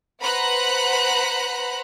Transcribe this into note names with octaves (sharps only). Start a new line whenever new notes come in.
B4 C5 F#5 A#5 B5 F#6